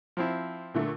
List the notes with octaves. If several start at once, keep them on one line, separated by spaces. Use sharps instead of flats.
F3 C4 E4
A#2 D3 A3